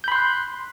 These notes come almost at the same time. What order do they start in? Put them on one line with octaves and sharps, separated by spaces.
G6 B5 C6 F#6